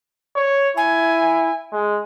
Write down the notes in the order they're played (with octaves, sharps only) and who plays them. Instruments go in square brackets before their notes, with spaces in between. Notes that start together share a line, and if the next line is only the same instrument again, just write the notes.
[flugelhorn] C#5
[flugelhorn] E4 [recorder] G#5
[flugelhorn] G#3